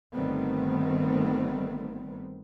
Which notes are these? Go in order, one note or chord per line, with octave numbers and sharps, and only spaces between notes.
G1 D#3 G3 A3 B3 C4